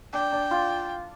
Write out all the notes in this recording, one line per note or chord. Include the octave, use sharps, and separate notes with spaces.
D4 G5
D4
F4